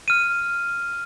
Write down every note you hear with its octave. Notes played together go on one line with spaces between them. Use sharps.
F6 D#7